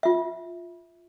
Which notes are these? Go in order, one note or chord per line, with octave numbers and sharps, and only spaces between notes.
F4 E5